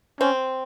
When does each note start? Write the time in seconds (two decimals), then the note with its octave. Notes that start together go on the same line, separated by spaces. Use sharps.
0.20 C4 C#4